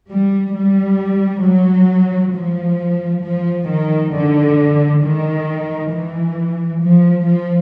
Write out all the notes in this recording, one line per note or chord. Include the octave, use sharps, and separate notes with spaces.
G3
G3
F#3
F3
F3
D#3
D3
D#3
E3
F3
F3